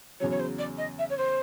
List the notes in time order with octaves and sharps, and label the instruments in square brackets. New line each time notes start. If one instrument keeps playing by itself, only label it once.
[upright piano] E2 C#3 F#3 [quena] C#5
[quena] C#5
C5
D5
D#5
E5
C#5
C5